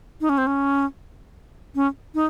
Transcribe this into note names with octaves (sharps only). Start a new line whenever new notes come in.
D#4
C#4
C4
C#4
C#4
D#4